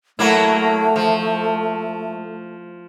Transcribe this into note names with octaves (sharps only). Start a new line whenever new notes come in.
F#3 A3 A#3 E4
F3